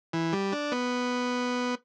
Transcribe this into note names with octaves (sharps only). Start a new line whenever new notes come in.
E3
G3
D4
B3